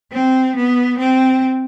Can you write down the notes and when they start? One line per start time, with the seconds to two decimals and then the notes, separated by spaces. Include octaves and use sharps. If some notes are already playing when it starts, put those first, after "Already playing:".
0.13 C4
0.56 B3
0.99 C4